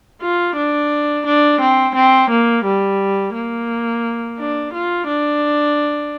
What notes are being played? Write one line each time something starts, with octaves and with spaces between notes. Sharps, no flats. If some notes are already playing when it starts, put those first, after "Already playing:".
F4
D4
D4
C4
C4
A#3
G3
A#3
D4
F4
D4